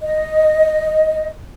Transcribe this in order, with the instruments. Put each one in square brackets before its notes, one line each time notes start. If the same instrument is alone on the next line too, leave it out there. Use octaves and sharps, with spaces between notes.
[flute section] D#5